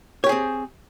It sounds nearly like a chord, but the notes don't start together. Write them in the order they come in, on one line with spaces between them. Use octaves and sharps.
C#5 G4 G#4 C4